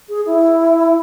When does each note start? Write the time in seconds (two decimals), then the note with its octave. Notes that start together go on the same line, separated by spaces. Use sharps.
0.09 G#4
0.26 E4